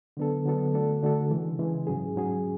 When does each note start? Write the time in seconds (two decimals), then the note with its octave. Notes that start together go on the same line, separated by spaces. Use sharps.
0.17 D3 F#3 B3 D4 A4
0.46 D3 F#3 B3 D4 A4
0.73 D3 A3 D4 F#4 A4
1.03 D3 A3 D4 F#4 A4
1.31 C#3 E3 G#3
1.59 C#3 E3 G#3
1.87 G#2 F#3 C#4 G#4
2.16 G#2 F#3 C#4 G#4